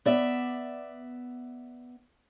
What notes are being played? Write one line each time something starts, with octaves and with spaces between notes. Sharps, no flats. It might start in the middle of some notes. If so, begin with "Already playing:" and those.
B3 D5 E5